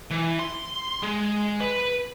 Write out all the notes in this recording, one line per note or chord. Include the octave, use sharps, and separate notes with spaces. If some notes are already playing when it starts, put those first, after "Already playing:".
E3
C6
G#3
B4